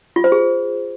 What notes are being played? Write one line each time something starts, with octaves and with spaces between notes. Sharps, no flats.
F4
C5
G#4